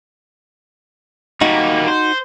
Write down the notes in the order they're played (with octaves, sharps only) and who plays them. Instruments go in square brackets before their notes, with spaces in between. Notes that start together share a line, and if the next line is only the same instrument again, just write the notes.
[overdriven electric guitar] G3 A#3 [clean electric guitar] D#4 F#4
[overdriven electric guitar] C5